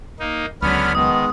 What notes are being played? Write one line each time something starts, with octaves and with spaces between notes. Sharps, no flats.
A#3 D#4
C#2 D3 F#3 B3 C#4 B5 F6
D#3 G#3 B3 D#6